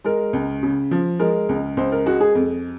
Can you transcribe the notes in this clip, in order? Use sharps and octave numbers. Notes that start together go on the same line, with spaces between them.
G#3 A#4
C#2
C#3
F3
G#3 A#4
C#2
C#2 C5
A#4
G#3 F#4
G#4
F2